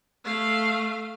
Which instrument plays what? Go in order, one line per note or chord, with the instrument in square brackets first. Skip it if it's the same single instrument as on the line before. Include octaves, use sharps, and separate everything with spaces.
[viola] A3 F5